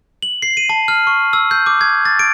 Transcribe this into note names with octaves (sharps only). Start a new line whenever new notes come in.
F#7
C7
D#7
A5
F6
C#6
E6
G6
D6
G#6
A6
D7